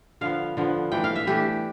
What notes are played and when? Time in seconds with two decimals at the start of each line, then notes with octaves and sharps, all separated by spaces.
0.21 D3 F3 B3 F5
0.57 D3 F3 B3
0.92 E3 A3 D4 G5
1.04 F5
1.16 E5
1.27 E3 A3 D4 G4